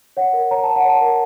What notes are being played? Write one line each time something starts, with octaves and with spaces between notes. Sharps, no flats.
C#5 F#5
A#4
C#5 A#5
C#5 A5
F#5
C#5 A5
A#4